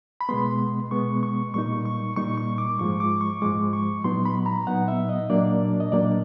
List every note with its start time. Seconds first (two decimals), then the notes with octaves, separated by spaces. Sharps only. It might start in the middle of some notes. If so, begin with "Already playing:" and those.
0.21 B5
0.29 B2 G#3 B3 C6
0.91 B2 G#3 B3 C#6
1.23 C#6
1.54 A#2 G3 A#3 D#4 C#6
1.85 C#6
2.16 A#2 G3 A#3 D#4 C#6
2.38 C#6
2.58 D6
2.79 G#2 F3 G#3 C#6
3.00 D6
3.21 C#6
3.42 G#2 F3 G#3 D6
3.73 C#6
4.04 A#2 F#3 B3 D#4 C6
4.25 B5
4.46 A#5
4.67 A#2 F#3 B3 D#4 F#5
4.88 E5
5.09 D#5
5.30 A#2 F#3 A#3 D4 D5
5.80 D#5
5.92 A#2 F#3 A#3 D4 D5